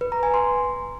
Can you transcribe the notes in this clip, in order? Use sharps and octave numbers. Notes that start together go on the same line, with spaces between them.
B4
A#5
G#5
C6